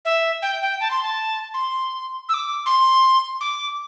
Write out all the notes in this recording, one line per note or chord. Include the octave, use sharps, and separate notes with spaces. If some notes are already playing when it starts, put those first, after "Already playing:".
E5
G5
G5
A5
C6
A5
C6
E6
D6
C6
D6